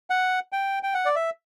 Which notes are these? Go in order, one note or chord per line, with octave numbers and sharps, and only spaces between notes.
F#5
G5
G5
F#5
D5
E5